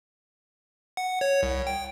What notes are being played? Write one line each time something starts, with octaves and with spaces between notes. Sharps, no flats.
F#5
C#5
C2
G5